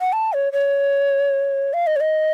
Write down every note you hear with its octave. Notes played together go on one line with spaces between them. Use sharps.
F#5
A5
C#5
C#5
F5
D#5
C#5
D#5